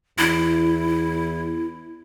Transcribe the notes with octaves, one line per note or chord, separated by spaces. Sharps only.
E2 E4